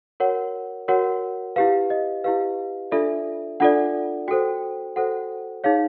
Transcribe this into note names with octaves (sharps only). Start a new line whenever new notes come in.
F#4 A#4 C#5 F#5
F#4 A#4 C#5 F#5
E4 G4 B4 F5
D#5
E4 G4 B4 F5
D4 F4 A4 D5 E5
D4 F4 A4 D5 F#5
F#4 A4 C5 G5
F#4 A4 C5 F#5
D#4 G#4 C#5 F5